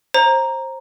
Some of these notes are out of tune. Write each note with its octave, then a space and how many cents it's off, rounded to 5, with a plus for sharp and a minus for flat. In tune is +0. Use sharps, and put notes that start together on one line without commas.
C5 +25 A#5 +0